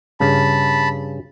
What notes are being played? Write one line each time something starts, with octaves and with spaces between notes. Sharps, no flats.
G2 C#3 A5 B5